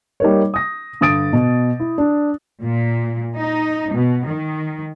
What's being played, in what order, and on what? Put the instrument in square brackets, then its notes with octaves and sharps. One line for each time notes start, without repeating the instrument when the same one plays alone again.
[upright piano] G3 A#3 D#4 A#4 C#5
D#6 A#6
G2 D3 D#6 A6 D7
B2
E4
D4
[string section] A#2
D#4
B2
D#3